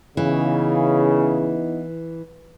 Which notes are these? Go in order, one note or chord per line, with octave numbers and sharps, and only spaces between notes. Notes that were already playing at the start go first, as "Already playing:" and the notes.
C#3 E3 B3 D#4 E4